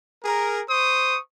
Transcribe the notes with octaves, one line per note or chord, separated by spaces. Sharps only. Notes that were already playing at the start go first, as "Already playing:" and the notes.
G#4 A#4
C5 C#6 D#6